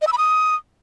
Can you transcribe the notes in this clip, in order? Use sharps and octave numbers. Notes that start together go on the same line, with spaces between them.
D#5
E6
B5
D#6